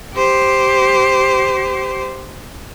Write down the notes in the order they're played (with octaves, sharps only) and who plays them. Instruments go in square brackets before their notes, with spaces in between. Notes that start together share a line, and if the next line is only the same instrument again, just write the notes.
[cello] G4 C5